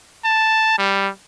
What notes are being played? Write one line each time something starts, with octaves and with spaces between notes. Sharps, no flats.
A5
G3